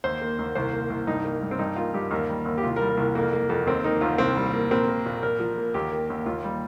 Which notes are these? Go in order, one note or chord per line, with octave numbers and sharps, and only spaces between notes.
D#2 C5
A#3
D#2
C2 C5
A#3
C2
G2 D#4
A#3
G2
C4
G2 D#4
A#3 F4
G2 G4
D#2 A#4
G3
D#2
G4
C2 F4
A#4
G3
A#4
C2
F2 A#3
A#3
F2
D#2 C4
A#3 D#4
D#2 F4
C2 C4
G3
A#3
A#1 C4
A#3
A#1
A#1 A#4
F3
A#3
D#2 G4
A#3
D#2
D#2 F4
G3